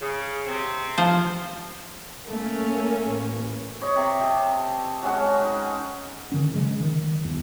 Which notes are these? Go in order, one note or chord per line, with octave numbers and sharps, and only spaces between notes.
C#3
C3 C4
F3 C5
A3 A#3 C#4
A1
C5 C#5 D#5
C3
G4 A4
F#3 G#3 C#4 F#4
D#4
D3 D#3 C#4
C#3 F#3 G#3
D#3
D#1 E2